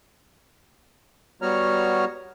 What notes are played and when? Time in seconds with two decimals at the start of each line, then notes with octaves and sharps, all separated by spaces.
1.42 G3 B3 F#4 C#5 A#5 F6